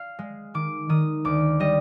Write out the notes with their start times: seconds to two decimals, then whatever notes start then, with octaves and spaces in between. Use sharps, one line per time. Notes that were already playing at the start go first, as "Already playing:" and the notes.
Already playing: F5
0.19 G#3
0.54 D#3 D6
0.89 D#3 D#6
1.25 D2 D6
1.60 G3 D#5